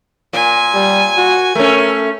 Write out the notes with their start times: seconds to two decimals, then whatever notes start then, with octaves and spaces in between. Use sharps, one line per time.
0.33 A#2 G#5
0.75 G3
1.17 F#4
1.55 A3 C#4 A#4